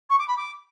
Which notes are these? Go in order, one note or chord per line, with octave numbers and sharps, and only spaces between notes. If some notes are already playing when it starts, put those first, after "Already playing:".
C#6
D6
B5
D6